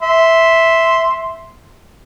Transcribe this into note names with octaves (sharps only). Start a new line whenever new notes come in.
E5 C6